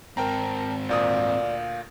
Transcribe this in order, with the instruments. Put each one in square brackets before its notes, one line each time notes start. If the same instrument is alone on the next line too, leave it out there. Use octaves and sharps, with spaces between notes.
[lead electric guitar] G#2 C4 [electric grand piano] A#4 G5 A#5 [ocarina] A5
[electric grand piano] D2 A#2 D#6 [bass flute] D5 [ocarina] F5